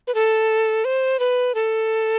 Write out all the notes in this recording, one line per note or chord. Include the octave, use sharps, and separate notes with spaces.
B4
A4
C5
B4
A4